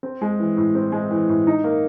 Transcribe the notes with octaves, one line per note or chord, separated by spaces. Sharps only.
C4
G#3
E3
A2
C4
G#3
E3
A2
D#4
A#3